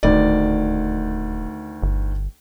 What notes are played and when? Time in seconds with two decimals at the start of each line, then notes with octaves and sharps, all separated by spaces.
0.03 D#1 D2 D#3 D5
1.83 G1